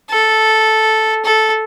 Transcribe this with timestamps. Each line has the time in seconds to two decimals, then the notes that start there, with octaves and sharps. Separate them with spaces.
0.11 A4
1.25 A4